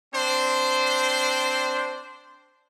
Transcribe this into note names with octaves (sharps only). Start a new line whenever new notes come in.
C4 D4 C5